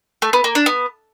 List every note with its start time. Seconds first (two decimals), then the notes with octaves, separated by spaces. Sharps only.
0.22 A3
0.33 B3
0.44 A#3
0.55 D4
0.66 B3